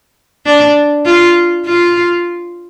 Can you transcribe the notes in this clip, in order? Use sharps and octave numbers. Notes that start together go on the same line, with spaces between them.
D4
F4
F4